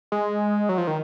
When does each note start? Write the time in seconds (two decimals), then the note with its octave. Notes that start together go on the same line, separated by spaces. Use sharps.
0.12 G#3
0.69 F#3
0.78 F3
0.87 D#3